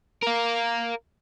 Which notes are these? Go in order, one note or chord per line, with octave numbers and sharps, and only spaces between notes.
A#4 F5